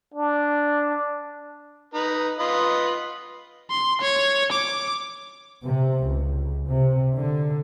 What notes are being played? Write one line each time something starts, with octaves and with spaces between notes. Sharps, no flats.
D4
D#4 B4
F4 B4 D#5
C6
C#5
D6
C3
C#2
C3
D3